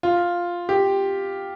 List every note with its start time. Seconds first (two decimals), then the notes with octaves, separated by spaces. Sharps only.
0.03 F4
0.69 G4